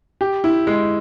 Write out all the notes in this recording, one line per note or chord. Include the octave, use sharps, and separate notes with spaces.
G4
E4
G#3